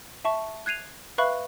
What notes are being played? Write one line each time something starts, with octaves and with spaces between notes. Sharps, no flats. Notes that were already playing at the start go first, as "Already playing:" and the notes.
E5 A5 C#6
F#6 G#6 C7 D#7 F7
B4 E5 F5 B5 C#6 F#6